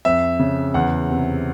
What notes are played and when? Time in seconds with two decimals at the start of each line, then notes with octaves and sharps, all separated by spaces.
0.05 F2 E5
0.39 C#3
0.74 E2 F#5
1.10 C3